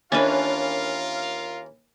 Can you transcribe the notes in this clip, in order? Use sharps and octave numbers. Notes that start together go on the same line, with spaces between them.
D#2 E3 C#4 D4 F4 A#4 B4 F5